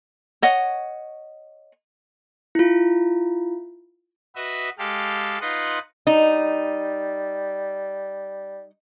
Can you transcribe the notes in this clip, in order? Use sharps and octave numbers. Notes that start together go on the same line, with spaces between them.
C#5 D#5 F#5
E4 F4
F#4 B4 D#5 E5
G#3 G4 A4 F5
D#4 F4 B4 D#5 F#5 C6
G3 D#4